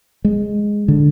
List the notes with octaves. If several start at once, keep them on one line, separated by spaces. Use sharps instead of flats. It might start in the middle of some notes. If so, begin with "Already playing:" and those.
G#3
D3